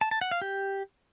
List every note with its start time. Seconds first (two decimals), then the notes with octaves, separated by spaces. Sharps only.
0.01 A5
0.11 A5
0.21 F#5
0.31 F5
0.42 G4